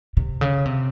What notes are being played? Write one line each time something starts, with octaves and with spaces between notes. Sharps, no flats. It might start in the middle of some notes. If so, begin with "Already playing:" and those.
C3
C#3
C3